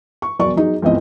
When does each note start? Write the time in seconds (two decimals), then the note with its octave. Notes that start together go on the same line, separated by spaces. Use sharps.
0.22 C#6
0.39 E1 F#3 D5 C#6
0.56 F#3 D#4 G#4
0.82 G1 C#2 E3 C4 D#5